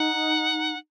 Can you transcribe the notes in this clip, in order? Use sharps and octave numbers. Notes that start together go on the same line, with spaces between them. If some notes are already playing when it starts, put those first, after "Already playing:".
Already playing: D#4 F#5